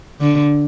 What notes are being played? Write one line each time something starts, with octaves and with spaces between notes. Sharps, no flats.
D3